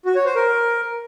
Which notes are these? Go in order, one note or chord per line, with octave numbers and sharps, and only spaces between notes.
F#4
C#5
C5
A#4